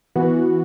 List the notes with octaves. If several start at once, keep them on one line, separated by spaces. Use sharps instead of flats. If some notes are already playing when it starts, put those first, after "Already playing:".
E3 B3 F#4